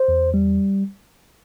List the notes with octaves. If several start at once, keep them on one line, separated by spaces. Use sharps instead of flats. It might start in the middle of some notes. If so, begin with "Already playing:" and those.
Already playing: C5
E2
G3